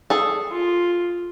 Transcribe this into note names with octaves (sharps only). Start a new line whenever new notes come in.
G#4 A4
F4